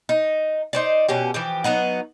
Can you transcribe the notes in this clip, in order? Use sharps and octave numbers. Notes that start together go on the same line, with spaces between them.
D#4
D#4 C5 D5
B2 C#4 G4
E3 F3 G4
F#3 B3 D#4 F#5